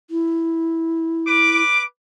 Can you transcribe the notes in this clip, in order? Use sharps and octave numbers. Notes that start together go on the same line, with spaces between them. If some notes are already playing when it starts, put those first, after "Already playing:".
E4
B4 D6